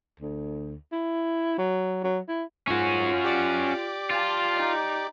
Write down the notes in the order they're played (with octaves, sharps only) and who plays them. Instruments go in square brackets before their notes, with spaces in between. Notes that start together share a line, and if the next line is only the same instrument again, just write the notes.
[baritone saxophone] D2
E4
F#3
F#3
E4
[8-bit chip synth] G#2 G#5 [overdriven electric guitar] C#4 F#4 [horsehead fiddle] F4
[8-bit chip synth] G4 D5 D6
[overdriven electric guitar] F4 [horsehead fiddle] F5 A5
[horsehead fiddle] D#4